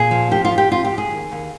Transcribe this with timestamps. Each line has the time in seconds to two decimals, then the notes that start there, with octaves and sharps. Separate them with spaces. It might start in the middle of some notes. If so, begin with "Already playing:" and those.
Already playing: A#2 G#4
0.11 F3
0.31 F2 G4
0.45 F4
0.52 F2
0.58 G4
0.71 F2 F4
0.85 G4
0.91 F2
0.98 G#4
1.11 D#2
1.31 D#2